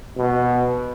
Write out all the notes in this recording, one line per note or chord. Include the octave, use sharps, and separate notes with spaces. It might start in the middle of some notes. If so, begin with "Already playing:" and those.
B2